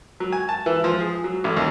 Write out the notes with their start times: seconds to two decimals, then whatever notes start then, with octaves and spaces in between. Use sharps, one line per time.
0.20 F#3
0.32 G#5
0.49 A5
0.66 E3
0.84 F3
1.01 G#4
1.24 F#3
1.44 A1
1.57 D#2